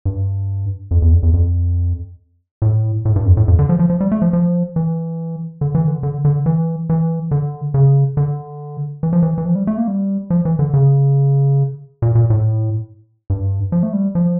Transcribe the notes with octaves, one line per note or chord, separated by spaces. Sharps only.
G2
F2
E2
F2
E2
F2
A2
A2
G2
F2
A2
F2
D3
F3
F3
F3
G3
A3
F3
F3
E3
D3
E3
D3
D3
D3
E3
E3
D3
C#3
D3
E3
F3
E3
E3
F3
G3
A3
A#3
G3
F3
E3
D3
C#3
A#2
A#2
A2
G2
F3
A3
G3
F3